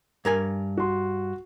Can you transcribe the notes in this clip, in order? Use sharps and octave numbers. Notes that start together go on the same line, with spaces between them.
G2 A#4 G#5
F#4 C6